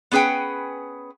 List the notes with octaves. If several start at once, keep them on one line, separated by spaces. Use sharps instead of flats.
B3 C#4 G#4 B4 G5